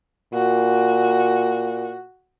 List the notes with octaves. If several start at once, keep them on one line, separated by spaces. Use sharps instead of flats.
A#2 F#4